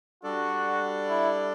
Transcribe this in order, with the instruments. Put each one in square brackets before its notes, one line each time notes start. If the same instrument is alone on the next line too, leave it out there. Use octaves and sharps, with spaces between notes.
[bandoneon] G3 D4 A4 D5 [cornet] F#4
[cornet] E4